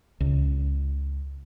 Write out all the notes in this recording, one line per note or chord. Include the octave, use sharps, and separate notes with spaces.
C#2